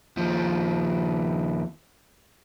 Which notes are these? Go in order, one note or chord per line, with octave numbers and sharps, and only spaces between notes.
D#2 F3